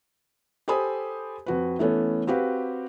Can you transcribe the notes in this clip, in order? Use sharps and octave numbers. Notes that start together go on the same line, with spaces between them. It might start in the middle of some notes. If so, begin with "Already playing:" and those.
G4 A4 C5 G#5 B5 D#6
F2 F#4 B4
E3 A3 B3 C#4 A4
C4 F#4 G4 B4 F5